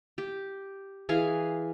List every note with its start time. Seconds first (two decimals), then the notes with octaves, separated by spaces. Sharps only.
0.18 G4
1.09 E3 G#4 F5